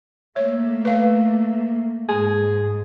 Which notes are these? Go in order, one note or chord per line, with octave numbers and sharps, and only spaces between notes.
A3 A#3 C#5 E5
B4 F5
G#2 G#4